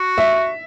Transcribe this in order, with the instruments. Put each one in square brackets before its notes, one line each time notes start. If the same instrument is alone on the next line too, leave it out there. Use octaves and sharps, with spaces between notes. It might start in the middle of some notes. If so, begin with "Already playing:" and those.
Already playing: [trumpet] F#4
[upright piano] E5